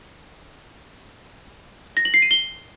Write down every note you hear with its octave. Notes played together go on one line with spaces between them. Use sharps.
A#6
F#7
C7
D#7
G7